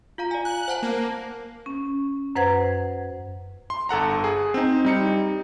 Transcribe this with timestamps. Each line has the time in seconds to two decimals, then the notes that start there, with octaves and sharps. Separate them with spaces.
0.18 F4 F5 A#5
0.31 D5 G#5
0.45 F#6
0.68 C5 F#5 A5
0.83 A#3
1.66 C#4
2.36 F#2 B4 C5 F#5 G#6
3.70 C6
3.89 G1 A4 F#5 A#5
4.24 G#4
4.54 C4 D#4
4.85 G3 D#4 C#7